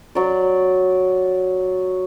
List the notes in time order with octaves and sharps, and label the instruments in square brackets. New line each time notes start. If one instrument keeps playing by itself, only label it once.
[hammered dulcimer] F#3 D5